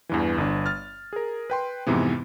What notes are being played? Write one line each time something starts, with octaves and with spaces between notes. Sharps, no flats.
E2 G2 E3
G1 D4
F6 A6
G#4 A#4
B4 G5 C6
F2 G#2 C3 E3 B3